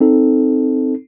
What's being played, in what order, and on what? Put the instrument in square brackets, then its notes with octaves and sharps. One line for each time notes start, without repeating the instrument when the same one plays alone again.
[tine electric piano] C4 D#4 A4